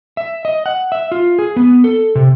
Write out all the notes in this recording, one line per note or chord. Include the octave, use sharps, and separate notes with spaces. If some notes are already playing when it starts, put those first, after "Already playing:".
E5
D#5
F#5
E5
F4
G#4
B3
A4
C3